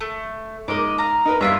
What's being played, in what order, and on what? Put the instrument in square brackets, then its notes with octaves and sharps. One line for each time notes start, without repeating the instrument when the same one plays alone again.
[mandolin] A3
[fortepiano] G#2 G#3 A#4 [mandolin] D#5 D6
[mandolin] F5 A#5
[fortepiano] D#4 A#4 B4
[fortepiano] G2 A#5 [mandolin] E4 F4 E5